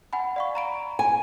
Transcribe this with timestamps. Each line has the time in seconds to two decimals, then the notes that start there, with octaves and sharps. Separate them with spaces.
0.13 F#5 G#5 B5
0.36 D5 F5 C#6
0.55 A#5 B5 D7
0.99 G#5